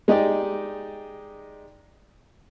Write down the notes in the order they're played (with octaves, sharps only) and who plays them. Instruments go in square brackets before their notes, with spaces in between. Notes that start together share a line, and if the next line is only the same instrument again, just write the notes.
[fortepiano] G#3 D#4 G4 D5